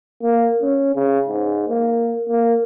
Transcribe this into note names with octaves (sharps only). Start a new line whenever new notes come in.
A#3
C#4
C#3
G#2
A#3
A#3